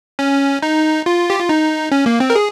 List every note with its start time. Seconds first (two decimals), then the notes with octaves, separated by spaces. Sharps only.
0.19 C#4
0.62 D#4
1.06 F4
1.30 G4
1.40 F4
1.49 D#4
1.92 C#4
2.06 A#3
2.20 C4
2.30 A#4
2.35 G#4